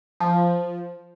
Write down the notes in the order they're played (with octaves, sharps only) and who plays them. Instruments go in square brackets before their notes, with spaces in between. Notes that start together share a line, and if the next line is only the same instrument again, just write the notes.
[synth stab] F3